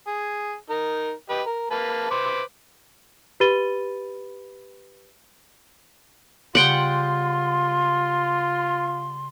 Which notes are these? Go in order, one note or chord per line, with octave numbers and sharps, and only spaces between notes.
G#4
D#4 A#4
G4 B4 D#5
A#4
A#3 B4 A5
B4 C5 D6
G4 B4 B5 A6 D#7 G7
C#3 G3 B3 F4 F#5 G5 C6